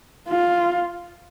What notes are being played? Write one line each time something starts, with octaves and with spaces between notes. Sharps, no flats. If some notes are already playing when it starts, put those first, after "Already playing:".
F4